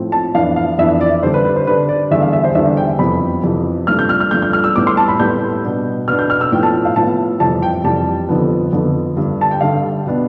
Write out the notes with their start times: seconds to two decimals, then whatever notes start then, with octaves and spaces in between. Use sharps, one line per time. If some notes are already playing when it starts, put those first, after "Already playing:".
Already playing: A2 F3 C4
0.12 A5
0.35 F2 E3 B3 D4 F5
0.56 F5
0.78 F2 E3 B3 D4 E5
1.01 D5
1.23 D3 G3 D4 C5
1.34 B4
1.45 B4
1.56 C5
1.67 D3 G3 D4 B4
1.89 D5
2.11 E2 D3 G3 D4 E5
2.22 F5
2.33 E5
2.44 C5
2.55 E2 D3 G3 D4 E5
2.77 G5
2.99 F2 C3 E3 B3 B5
3.43 F2 C3 E3 B3
3.87 G2 F3 A3 D4 F6
3.99 G6
4.09 F6
4.20 F6
4.31 G2 F3 A3 D4 G6
4.42 G6
4.53 F6
4.64 E6
4.75 A2 G3 B3 D6
4.87 C6
4.97 A5
5.08 B5
5.19 A2 G3 B3 G6
5.64 B2 B3 D4
6.08 B2 B3 D4 F6
6.19 G6
6.30 F6
6.41 E6
6.52 A2 F3 B3 G5
6.63 A5
6.85 F5
6.96 A2 F3 B3 A5
7.40 F2 C3 E3 G3 A5
7.62 G5
7.84 F2 C3 E3 G3 A5
8.29 F2 D3 F3 B3
8.73 F2 D3 F3 B3
9.17 G2 D3 G3
9.41 A5
9.51 G5
9.61 G2 D3 G3 F5
10.06 B2 B3 D4